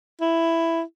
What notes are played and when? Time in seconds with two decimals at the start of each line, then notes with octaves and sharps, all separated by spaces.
0.21 E4